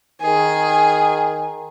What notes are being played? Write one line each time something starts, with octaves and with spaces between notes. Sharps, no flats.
D#3 G#4